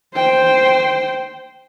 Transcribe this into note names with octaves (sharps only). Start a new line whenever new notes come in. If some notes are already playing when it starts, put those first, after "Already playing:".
C5 G5